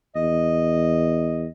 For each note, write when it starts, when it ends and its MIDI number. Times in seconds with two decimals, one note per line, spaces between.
0.16 1.46 40
0.16 1.48 75